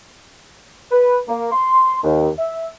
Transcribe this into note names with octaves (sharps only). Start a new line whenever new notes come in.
B4
A#3
C6
D#2
E5